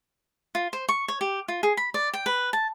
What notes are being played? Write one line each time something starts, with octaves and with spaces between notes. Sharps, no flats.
F4
C5
C#6
C#5
G4
F4
G#4
B5
D5
G5
B4
A5